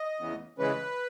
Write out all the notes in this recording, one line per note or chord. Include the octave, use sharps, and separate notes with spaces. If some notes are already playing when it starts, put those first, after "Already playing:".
Already playing: D#5
E2 C#3 E3 B3
C#3 E3 G#3 C#4 B4